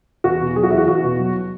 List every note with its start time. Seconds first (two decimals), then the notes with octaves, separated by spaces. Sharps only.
0.24 E2 F#4
0.40 B2
0.56 F#3 G#4
0.63 F#4
0.70 E2 E4
0.77 F#4
0.88 E2 F#4
1.03 B2
1.19 F#3